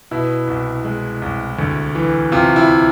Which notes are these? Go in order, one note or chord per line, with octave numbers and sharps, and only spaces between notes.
B2 E4
C2
G#3
C2
D2
E3
C3 F4
E4